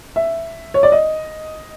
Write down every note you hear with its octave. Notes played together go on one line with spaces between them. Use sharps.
E5
C#5
D5
D#5